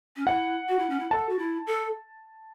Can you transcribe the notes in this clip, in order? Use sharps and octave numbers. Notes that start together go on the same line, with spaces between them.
C#4
E4 F#5
F#4
E4
C#4
E4
A4 A5
F#4
E4
A4